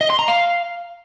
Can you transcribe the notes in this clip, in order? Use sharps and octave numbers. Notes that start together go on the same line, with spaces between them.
D#5
C6
A#5
F5